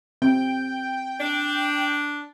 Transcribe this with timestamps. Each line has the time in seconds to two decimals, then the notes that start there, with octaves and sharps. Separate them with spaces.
0.22 C4 G5
1.20 D4